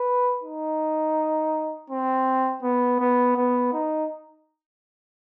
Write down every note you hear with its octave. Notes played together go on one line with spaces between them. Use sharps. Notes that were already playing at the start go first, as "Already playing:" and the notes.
Already playing: B4
D#4
C4
B3
B3
B3
D#4